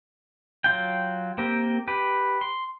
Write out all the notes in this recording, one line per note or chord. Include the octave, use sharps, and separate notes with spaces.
F#3 F4 G5
A#3 C4 G4 A#4
G4 B4
C6